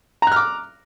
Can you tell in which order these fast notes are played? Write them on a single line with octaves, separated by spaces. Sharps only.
A#5 F#6 F6 D6